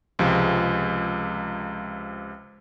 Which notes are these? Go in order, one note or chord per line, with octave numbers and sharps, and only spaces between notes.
C#2 C3 F3 G#3